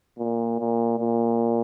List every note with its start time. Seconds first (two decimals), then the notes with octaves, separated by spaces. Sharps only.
0.18 A#2
0.59 A#2
0.99 A#2